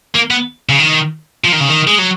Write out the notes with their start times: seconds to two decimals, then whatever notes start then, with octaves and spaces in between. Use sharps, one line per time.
0.15 A#3
0.31 B3
0.69 C#3
0.79 D#3
1.44 F3
1.53 D#3
1.61 C#3
1.69 D#3
1.88 G#3
1.99 F#3